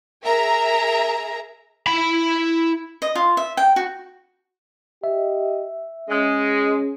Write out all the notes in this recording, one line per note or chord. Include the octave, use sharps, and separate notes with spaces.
G#4 A#4 E5 A#5
E4 B5
D#5
F4
E5
G5
F#4
G4 D#5 E5
G#3 C#4 G#4